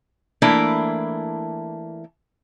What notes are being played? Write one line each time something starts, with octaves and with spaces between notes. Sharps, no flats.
E3 A3 A#3 D4 E4